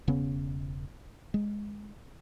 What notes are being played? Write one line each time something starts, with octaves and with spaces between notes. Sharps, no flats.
E1 C#3 B3 C#4
G#3